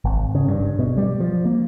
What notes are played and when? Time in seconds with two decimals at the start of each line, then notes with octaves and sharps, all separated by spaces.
0.05 G#1
0.35 C#3
0.48 G2
0.79 B2
0.97 G3
1.20 F3
1.45 A#3